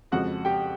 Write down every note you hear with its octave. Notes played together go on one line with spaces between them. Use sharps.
F2 C#3 F3 G#3 F#4 F#5
G4 G5